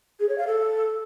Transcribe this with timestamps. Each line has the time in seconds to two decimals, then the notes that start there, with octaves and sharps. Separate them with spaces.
0.20 G#4
0.29 C#5
0.38 F5
0.47 A4